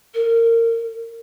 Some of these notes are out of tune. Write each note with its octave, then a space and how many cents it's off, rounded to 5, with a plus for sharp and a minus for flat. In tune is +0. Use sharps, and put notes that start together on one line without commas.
A#4 -25